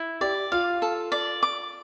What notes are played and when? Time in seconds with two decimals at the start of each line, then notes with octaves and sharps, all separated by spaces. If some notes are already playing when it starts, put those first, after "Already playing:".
Already playing: E4
0.21 G4 D5
0.52 F4 F5
0.82 A4
1.12 D5
1.43 D6